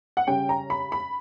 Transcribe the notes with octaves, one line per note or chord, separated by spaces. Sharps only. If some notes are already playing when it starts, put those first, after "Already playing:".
F#5
C#3 G3 C#4 G5
A#5
B5
B5